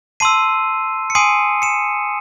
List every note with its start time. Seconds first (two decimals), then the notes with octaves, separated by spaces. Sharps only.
0.20 A5 C6 E6 C7 D#7
1.10 C#7
1.15 G#5 C6 D#6 C7 D#7
1.62 C#7 E7